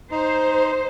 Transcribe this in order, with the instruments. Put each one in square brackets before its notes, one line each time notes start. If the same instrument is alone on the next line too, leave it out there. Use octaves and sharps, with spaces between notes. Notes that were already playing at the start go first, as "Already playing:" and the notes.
[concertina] D#4 [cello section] C5